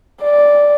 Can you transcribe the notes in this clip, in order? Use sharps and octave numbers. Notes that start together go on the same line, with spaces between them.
D5